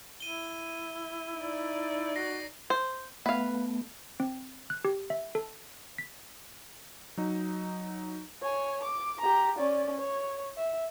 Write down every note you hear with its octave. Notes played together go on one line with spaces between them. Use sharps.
E4 D#7 G7
D#4 D5
F#4 A#6 C7
C5
A3 B3 B4 F5
C4
F#6
G4
E5
A4
B6
F#3 D#4
C#5 G#5
D6
G4 A#5
C#4 D5
C#5
E5